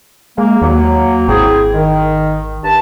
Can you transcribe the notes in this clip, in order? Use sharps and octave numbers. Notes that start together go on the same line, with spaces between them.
G#3 A#3
D#2 F#3 A#3
G#1 C4 E4 G#4
D#3
G2 B4 A5